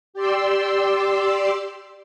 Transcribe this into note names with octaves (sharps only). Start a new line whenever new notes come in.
G4 D5 C6 E6